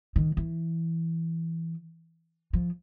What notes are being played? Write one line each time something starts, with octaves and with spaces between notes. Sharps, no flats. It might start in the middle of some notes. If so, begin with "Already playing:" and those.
D#3
E3
F3